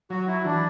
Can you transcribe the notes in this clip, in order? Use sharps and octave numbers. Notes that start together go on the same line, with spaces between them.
F#3 F#4
E4
E3 D4